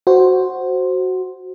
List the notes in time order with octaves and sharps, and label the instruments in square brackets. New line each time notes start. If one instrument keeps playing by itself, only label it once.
[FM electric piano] F#4 C5